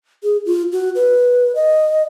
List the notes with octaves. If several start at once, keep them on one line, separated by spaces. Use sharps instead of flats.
G#4
F4
F#4
B4
D#5